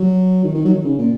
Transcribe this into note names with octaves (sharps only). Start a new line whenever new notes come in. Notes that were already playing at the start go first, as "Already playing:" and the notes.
Already playing: F#3
D#3
D#3
F#3
D#3
C#3
A#2